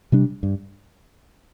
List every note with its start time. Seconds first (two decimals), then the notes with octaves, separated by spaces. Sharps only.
0.12 C3 G3 D4
0.43 G2